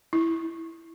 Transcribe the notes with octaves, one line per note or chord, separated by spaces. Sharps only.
E4